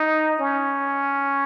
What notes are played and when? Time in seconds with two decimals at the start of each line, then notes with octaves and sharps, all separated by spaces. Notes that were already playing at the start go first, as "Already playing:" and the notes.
Already playing: D#4
0.39 C#4